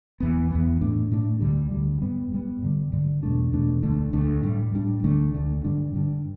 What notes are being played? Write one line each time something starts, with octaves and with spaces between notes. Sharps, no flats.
E2 E3 B3
E2 E3 B3
A2 A3 D4
A2 A3 D4
D2 D3 G3
D2 D3 G3
G2 G3 B3
G2 G3 B3
G2 D3 G3
G2 D3 G3
E2 B2 A3 D4
E2 B2 A3 D4
D2 D3 A3 D4
D2 D3 A3 D4
A2 G3 D4
A2 G3 D4
D2 D3 A3 D4
D2 D3 A3 D4
G2 D3 G3 D4
G2 D3 G3 D4